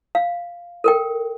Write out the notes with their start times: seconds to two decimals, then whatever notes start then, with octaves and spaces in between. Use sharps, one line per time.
0.15 F5
0.84 A4 A#4 G5